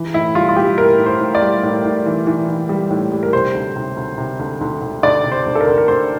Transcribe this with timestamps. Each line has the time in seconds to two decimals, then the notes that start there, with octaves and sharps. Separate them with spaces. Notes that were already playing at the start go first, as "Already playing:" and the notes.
Already playing: E3
0.14 A2 E4
0.35 G3 F4
0.49 F4
0.56 G3 G4
0.78 A2 A#4
0.99 A2
1.06 C5
1.20 A2
1.35 D5
1.42 G3
1.63 A2
1.85 A2
2.06 E3
2.27 E3
2.48 E3
2.69 G3
2.91 A2
3.12 G3
3.23 A#4
3.33 C3 C5
3.54 D2
3.76 C3
3.97 D2
4.18 C3
4.39 D2
4.61 D2
4.82 D2
5.03 D2 D5
5.24 C3
5.32 C5
5.46 D2
5.55 A4
5.61 A#4
5.67 D2
5.78 A#4
5.88 D2 C5